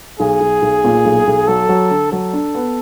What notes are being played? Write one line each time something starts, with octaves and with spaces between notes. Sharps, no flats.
B1 G#4
B1
B1
A#2
B1
B1
F#3 A4
F#3
D3
F#3 A4
D4
B3